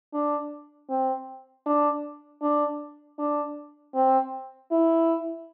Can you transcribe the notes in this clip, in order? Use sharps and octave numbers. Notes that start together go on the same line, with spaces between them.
D4
C4
D4
D4
D4
C4
E4